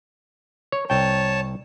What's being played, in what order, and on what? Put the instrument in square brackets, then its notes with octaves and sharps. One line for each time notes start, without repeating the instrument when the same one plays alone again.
[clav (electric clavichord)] C#5
[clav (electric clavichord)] C2 G5 [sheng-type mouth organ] C#5 A5